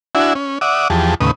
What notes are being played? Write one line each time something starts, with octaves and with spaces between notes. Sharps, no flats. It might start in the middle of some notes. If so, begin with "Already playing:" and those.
D4 E4 F#4 E5 G#5
C#4
D5 E5 F#5 D6 D#6
E2 F3 G4 G#4 A5
D#2 A2 C#3 B4 D#6